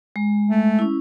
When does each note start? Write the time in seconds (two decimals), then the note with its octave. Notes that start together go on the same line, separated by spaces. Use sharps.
0.16 G#3
0.50 A3
0.79 C#4 E4